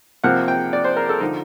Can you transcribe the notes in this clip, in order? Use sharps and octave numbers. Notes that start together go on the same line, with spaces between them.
C3 F3 A#3 F#5
G5
D5
C5
A#4
A4
D3 F3 D#4